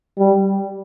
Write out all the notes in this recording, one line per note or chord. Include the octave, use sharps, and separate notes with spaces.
G3